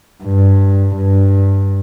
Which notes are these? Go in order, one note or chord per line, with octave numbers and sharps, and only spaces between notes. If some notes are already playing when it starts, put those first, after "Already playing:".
G2
G2